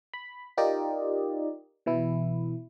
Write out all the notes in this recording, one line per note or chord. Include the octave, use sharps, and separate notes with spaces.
B5
D#4 F4 G4 A#4 D5 D#5
B2 E3 E4